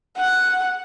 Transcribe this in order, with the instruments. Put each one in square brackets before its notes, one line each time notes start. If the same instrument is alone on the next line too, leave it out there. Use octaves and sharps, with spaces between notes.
[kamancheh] F#5